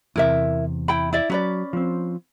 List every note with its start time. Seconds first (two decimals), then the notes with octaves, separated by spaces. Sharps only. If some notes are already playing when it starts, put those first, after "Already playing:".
0.16 E2 C3 E4 A#4 E5
0.88 E4 G5 B5
1.13 E4 D5 E5
1.30 F#3 C#4 B4 D5
1.73 F3 C4